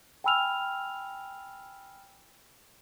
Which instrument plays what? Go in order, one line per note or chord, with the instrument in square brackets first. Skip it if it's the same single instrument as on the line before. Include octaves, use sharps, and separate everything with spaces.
[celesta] G5 G#5 B5 E6 F6 F7